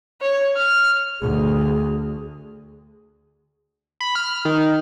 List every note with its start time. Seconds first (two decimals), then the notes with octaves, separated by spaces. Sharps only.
0.21 C#5
0.56 F6
1.21 D2 G#4
4.01 B5
4.15 F6
4.45 D#3